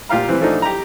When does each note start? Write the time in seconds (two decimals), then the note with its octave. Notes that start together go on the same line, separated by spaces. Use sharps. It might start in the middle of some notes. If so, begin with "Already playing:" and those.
0.09 A#2 F4 G4 F5 A#5
0.28 E3 C4 B4
0.40 E3 F3 A3 D4 D#4
0.62 G4 A#5